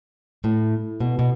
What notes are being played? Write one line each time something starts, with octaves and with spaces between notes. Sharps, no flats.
A2
B2
B2